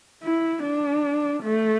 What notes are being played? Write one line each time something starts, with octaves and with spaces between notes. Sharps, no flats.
E4
D4
A3